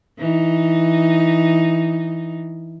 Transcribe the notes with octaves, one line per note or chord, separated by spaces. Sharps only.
E3 D#4